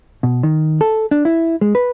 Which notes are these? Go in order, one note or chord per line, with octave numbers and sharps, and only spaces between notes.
B2
D#3
A4
D4
E4
G#3
B4